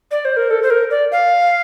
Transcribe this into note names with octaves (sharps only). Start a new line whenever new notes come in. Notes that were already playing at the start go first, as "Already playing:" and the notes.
D5
C5
A#4
A4
C5
A#4
D5
F5